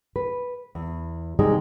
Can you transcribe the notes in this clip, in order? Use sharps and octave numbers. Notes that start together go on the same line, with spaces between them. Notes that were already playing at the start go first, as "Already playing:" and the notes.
B4
E2
C3 D#3 G3 G#3 D#4 G#4